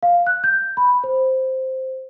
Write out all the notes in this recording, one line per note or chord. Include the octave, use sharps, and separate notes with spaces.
F5
F#6
G6
B5
C5